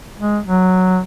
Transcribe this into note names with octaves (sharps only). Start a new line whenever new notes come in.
G#3
F#3